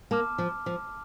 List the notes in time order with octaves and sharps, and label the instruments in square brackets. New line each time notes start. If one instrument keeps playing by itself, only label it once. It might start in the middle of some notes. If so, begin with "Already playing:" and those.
[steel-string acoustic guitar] A#3 [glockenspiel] A5 D6 F6
[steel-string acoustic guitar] F3
F3